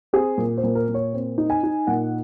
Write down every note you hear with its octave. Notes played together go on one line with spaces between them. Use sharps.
C4 G#4
A#2
C5
A#2
A#4
A#2
C#5
C4
D#4
G#5
D#4
A#2 F#5